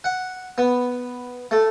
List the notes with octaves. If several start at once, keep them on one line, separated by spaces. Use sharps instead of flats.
F#5
B3
A3